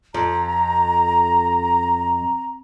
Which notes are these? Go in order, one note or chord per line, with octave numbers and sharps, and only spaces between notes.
F2 A#5